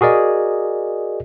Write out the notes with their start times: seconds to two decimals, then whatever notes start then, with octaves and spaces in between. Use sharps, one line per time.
0.01 F#4 G#4 A#4 D5 D#5